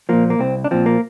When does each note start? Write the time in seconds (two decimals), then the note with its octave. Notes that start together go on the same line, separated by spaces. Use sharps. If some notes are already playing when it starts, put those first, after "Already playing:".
0.09 A#2 F3 A#3
0.30 A#3
0.39 C2 C4
0.64 D4
0.71 A#2 F3 C4
0.86 A#3